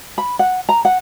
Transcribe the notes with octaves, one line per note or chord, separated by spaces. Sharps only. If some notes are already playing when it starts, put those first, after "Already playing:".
B5
F#5
A#5
F#5